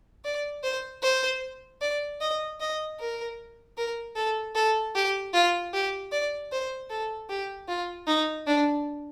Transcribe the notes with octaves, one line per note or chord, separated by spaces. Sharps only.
D5
C5
C5
D5
D#5
D#5
A#4
A#4
A4
A4
G4
F4
G4
D5
C5
A4
G4
F4
D#4
D4